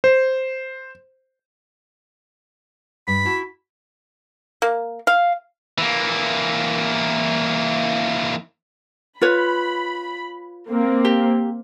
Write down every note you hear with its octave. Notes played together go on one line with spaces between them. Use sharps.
C5
G2 B5
E4 F#4 A5
A#3
F5
E3 A#3
F4 B4 C#5 B5
A#3 C4
G4